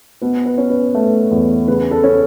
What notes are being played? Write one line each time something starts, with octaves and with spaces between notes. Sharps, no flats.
B2 B4
B4
C#4
B4
A3 B4
E2
C#3 B4
A4
C#4